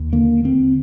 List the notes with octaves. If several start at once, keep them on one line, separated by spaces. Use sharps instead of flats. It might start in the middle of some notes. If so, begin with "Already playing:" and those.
Already playing: D#2
D3 A#3
D3 C4